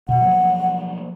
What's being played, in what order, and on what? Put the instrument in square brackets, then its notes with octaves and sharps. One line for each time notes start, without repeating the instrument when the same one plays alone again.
[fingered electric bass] B2 [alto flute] F#5
[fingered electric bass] F3 F#3 A#3